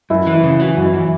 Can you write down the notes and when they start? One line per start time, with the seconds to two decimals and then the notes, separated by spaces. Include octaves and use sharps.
0.10 F#2 E4
0.26 E3
0.35 E4
0.43 C#3
0.60 E3 F#4
0.77 F#2
0.86 E4
0.94 E3